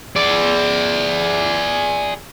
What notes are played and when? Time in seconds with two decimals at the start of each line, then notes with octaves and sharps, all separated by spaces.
0.16 G#4 D5